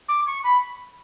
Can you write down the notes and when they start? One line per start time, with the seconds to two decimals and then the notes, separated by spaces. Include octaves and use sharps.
0.08 D6
0.27 C#6
0.44 B5